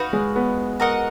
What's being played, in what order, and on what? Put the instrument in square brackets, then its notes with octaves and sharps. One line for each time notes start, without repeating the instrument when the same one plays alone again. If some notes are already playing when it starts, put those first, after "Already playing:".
Already playing: [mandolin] D#4 F#4 B4 F5
[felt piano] G#3
B3
[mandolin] F#4 A#4 D#5 F#5